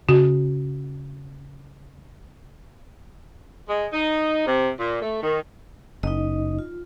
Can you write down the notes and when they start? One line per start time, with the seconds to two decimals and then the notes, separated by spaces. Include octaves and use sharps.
0.09 C#3 F#4
3.68 G#3
3.92 D#4
4.47 C3
4.79 A#2
5.02 A3
5.23 D#3
6.03 F#1 D#4 D#5
6.59 F4